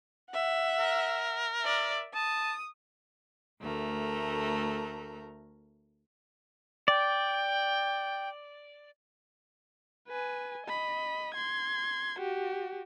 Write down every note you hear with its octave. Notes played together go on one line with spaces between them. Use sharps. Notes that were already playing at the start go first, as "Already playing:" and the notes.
E5 F#5
A#4
D5 E5
A5 D#6
D2 A3 A#4
D5 G5
B4 G#5
D#5 B5
C6 G#6
F#4 G4